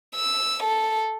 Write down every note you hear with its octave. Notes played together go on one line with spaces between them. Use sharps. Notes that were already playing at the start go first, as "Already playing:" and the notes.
E6
A4